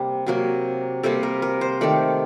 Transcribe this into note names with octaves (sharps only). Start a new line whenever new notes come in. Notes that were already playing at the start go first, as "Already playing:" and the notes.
Already playing: C3 G3 A#3
C3 F#3 A#3
C3 G3 A#3 A4
A#4
A#4
C5
D#3 A3 D5